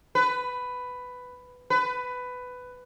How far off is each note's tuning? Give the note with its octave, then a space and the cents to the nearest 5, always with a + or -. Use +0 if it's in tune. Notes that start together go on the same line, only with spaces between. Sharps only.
B4 +10
B4 +15